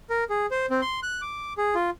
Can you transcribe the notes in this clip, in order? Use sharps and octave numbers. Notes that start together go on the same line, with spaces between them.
A#4
G#4
C5
C4
C6
F#6
D6
G#4
F4